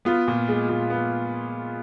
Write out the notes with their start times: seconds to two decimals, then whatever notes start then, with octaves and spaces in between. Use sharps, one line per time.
0.05 B3 F4
0.28 A#2
0.48 G#3
0.69 A#2
0.90 B3